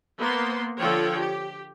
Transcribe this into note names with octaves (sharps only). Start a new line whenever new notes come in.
A#3 B3 C5 C6
D3 F3 A4 C#5 G5
G4